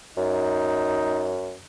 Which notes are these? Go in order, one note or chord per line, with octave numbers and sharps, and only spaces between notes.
F#2 D#4